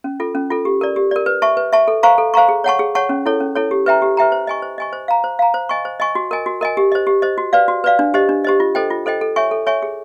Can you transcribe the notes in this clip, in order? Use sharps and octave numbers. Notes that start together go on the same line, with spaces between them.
C#4
F4 A4
C#4
F4 A4
G4
A#4 D5
G4
A#4 D5
B4
E5 A5 C#6
B4
E5 A5 C#6
A4
C5 F5 A#5 C#6
A4
C5 F5 A#5 C#6
G#4
C#5 F#5 A5 C#6
G#4
C#5 F#5 A5 C#6
C#4
E4 A4 C#5
C#4
E4 A4 C#5
G4
B4 E5 G5 A#5
G4
B4 E5 G5 A#5
C5
D#5 G#5 C#6
C5
D#5 G#5 C#6
C5
F5 A#5
C5
F5 A#5
C5
D#5 G#5 C#6
C5
D#5 G#5 C#6
F#4
A#4 D#5 G#5
F#4
A#4 D#5 G#5
G4
C5 D#5
G4
C5 D#5
F#4
B4 D5 F5
F#4
B4 D5 F5
D4
G4 C5 D#5
D4
G4 C5 D#5
F4
A4 C5 D#5 G5
F4
A4 C5 D#5 G5
A4
C#5 E5 G#5 C#6
A4
C#5 E5 G#5 C#6
G#4